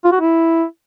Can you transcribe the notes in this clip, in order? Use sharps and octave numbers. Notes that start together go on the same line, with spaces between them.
F4
F#4
E4